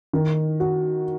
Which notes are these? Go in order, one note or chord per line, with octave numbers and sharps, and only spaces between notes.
D#3
F#4